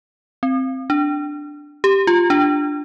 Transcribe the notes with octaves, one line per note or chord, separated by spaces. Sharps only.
C4
D4
G4
F4
D4